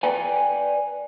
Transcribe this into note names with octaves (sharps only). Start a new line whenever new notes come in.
B4 D5 G5 G#5